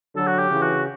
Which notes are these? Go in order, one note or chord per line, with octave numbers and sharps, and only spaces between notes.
D3 F#3 A4
F#4
G4
C#3 E3
F#4